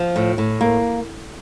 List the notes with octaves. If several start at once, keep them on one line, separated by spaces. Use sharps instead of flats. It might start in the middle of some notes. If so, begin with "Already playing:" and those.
Already playing: F3
A2
A2
A#3